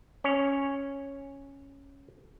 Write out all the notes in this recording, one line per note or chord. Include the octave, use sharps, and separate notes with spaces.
C#4 C#5